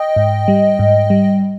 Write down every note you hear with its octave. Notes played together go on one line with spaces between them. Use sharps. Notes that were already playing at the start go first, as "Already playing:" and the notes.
Already playing: D#5 G5
G#2
G3
G#2
G3